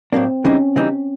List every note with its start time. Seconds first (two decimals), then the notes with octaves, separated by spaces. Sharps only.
0.13 A2 F#3 A#3 C4 D4
0.44 C#3 E3 G3 C4 C#4 D#4
0.76 C#3 E3 G3 C4 D#4